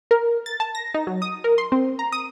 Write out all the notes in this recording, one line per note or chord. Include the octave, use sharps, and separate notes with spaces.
A#4
A6
A5
A#6
D#4
F#3
D#6
A#4
C6
C4
A#5
D#6